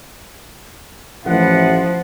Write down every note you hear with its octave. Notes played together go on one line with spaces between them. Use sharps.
A1 F3 E4 F#5